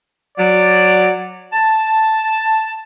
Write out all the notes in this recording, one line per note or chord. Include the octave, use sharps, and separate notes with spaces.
F#3 D5
A5